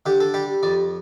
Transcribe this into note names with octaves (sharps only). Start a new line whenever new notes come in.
D3 G4
A4
G3 G4
F2 D5